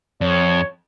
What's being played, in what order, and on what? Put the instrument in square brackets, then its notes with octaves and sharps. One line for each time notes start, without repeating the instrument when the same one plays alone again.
[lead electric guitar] F2 [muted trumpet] C#5